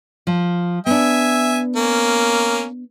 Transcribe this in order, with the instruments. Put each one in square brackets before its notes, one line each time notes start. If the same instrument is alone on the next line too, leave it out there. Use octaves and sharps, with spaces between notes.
[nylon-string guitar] F3
[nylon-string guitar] B3 D4 [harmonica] E5 G#5
[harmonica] A#3 C#4